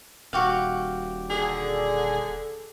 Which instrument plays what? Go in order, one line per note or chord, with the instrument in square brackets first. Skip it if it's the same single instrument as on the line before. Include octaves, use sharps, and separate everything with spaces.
[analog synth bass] D#1 [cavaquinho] F#4 G4 F5
[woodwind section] D3 [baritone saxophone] G#4